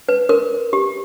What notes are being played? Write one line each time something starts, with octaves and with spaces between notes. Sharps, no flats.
B4
A#4
G4